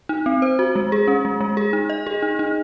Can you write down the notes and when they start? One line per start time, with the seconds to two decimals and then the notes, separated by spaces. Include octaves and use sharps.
0.09 D#4
0.26 C4
0.42 C5
0.59 F#4
0.76 G#3
0.92 G#4
1.08 C#4
1.25 G#3
1.41 G#3
1.57 G#4
1.73 D#4
1.90 D#5
2.07 G#4
2.22 D#4
2.39 D#4